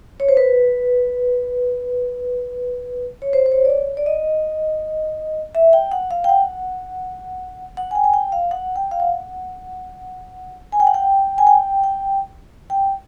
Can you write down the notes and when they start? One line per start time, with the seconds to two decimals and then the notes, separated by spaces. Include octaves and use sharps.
0.20 C#5
0.29 C5
0.37 B4
3.22 C#5
3.33 C5
3.46 C5
3.52 C#5
3.65 D5
3.70 C#5
3.97 D5
4.06 D#5
5.55 E5
5.73 G5
5.92 F#5
6.11 F5
6.24 G5
6.29 F#5
7.77 F#5
7.91 G#5
7.95 G5
8.04 G#5
8.14 G5
8.32 F5
8.51 F#5
8.76 G5
8.91 F5
9.00 F#5
10.72 G#5
10.80 G5
10.87 F#5
10.94 G5
11.38 G#5
11.47 G5
11.84 G5
12.70 G5